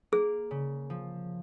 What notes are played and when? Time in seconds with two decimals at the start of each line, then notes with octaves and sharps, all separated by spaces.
0.12 A#3 G#4
0.51 C#3
0.90 F3